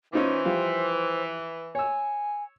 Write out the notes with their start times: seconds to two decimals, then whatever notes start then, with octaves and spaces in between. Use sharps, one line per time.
0.13 E3 C#4 D#4 F4 C5
0.45 F3 G3 F5
1.75 C#5 G#5 E6